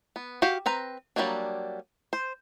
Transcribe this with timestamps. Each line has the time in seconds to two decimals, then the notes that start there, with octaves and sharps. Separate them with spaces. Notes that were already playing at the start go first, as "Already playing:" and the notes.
0.16 B3
0.42 F#4 G4 F5
0.66 C4 B4 A#5
1.16 F#3 G3 A3 A#3 D4
2.13 C5